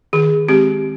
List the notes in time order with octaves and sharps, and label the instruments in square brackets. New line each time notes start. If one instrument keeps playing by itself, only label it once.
[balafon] D#3 G#4
G#3 C4 G4